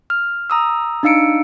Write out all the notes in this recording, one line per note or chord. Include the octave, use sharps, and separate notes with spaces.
F6
A#5 D#6 E6
D4 D#4 F5 E6 C#7 D7